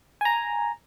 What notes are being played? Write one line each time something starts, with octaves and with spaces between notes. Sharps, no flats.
G#5 A#5